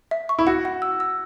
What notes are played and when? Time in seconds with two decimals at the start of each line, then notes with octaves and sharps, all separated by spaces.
0.11 E5
0.29 C#6
0.39 E4
0.47 F#4 F#5
0.65 F#5
0.82 E6
1.00 E6